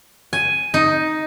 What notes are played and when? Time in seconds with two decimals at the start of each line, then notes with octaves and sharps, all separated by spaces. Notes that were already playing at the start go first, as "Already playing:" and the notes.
0.33 G#5
0.74 D#4